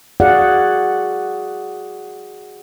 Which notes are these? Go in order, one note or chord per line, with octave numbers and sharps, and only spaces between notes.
F#4 G#4 D5 F5 F#5